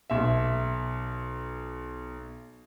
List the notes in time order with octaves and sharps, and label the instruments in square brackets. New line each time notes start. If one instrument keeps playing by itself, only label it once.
[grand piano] B1 E5